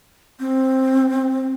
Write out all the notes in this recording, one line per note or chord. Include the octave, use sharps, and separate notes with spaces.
C4